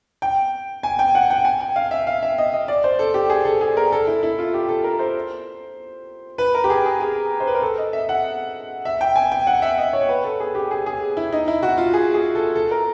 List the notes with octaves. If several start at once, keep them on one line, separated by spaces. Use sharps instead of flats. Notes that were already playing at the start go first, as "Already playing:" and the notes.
G5
G#5
G5
F#5
G5
G#5
G5
F5
E5
F5
E5
D#5
D#5
D5
C5
A4
G4
G#4
A4
G#4
A#4
A4
E4
E4
F4
G4
A4
A#4
C5
B4
A#4
G4
G#4
G#4
G#4
C5
B4
A#4
A4
D#5
E5
F#5
E5
G5
G#5
G5
F#5
E5
D#5
C#5
B4
A4
G#4
G4
G#4
G#4
E4
D#4
E4
F#4
F4
G#4
G#4
A4
A4
A#4